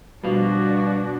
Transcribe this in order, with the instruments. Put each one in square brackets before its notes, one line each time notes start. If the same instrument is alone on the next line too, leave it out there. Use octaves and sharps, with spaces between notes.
[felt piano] B2 F3 [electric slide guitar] G3 F5 [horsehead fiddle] D4 F#4